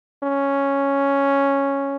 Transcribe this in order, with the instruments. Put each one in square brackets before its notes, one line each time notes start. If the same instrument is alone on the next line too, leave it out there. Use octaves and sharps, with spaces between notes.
[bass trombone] C#4